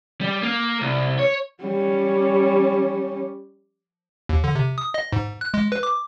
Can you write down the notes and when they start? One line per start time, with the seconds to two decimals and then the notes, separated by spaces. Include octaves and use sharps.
0.21 G3
0.43 A#3
0.81 C2
1.19 C#5
1.62 G3 C#4
4.29 D#2
4.44 D3
4.55 C3
4.78 D#6
4.94 D#5
5.12 G#2
5.41 F#6
5.54 G#3
5.72 B4
5.83 D6